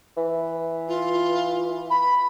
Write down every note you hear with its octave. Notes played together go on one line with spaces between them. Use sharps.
E3
F4
B5